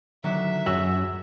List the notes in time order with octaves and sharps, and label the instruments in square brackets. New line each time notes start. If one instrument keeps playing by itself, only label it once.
[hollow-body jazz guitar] D3 D#3 F#3 [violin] E5
[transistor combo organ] F#2 [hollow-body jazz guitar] F#4 G#4 C#5 [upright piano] E6